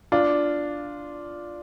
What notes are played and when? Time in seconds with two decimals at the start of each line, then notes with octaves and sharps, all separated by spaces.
0.12 D4 F4